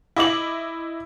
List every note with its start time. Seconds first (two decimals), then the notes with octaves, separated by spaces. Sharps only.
0.16 E4 D#5 D6 F#7